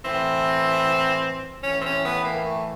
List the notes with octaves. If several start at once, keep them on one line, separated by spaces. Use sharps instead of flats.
A2 E3 C4
A2 E3 C#4
C4
C#4
B3
A#3
A3